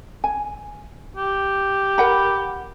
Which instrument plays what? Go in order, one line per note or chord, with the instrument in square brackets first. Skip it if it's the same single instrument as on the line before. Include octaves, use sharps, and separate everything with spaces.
[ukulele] G#5
[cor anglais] G4
[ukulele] A#4 F#5 B5